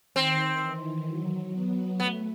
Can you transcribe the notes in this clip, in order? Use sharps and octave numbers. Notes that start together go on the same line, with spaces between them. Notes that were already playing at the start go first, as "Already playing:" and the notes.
D#3 C4
E3
F#3
B3
A3 B3